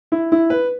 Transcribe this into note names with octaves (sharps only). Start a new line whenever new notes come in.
E4
E4
B4